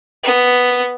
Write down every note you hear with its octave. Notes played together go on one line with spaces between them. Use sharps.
B3